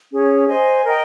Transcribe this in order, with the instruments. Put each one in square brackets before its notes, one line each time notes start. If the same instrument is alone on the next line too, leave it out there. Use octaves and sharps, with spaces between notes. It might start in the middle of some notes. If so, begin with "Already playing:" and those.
[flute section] C#4 G#4 C#5
C5 D#5 G#5
A#4 D#5 G5